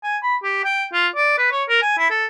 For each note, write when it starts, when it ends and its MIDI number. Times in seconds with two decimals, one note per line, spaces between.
0.04 0.17 80
0.23 0.36 83
0.43 0.61 67
0.64 0.86 79
0.93 1.08 65
1.16 1.34 74
1.38 1.51 71
1.52 1.64 73
1.68 1.77 70
1.82 1.94 80
1.98 2.09 64
2.10 2.26 69